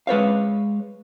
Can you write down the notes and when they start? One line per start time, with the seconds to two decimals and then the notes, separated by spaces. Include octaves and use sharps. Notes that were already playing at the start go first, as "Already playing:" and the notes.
0.07 G#3 B4 C#5 F5